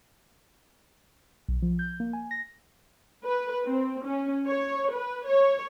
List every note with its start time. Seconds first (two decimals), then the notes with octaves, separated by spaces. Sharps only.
1.48 B1
1.62 F3
1.79 G6
2.00 A#3
2.13 G#5
2.31 A#6
3.24 B4
3.65 C4
4.05 C#4
4.47 C#5
4.92 B4
5.28 C#5